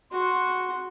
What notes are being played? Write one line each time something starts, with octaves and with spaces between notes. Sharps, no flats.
F#4 C6